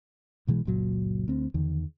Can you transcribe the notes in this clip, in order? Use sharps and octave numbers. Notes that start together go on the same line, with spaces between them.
B1 B2 E3 G#3
F#1 C#2 A#2 F#3
D2 C4
E2 D3 D#3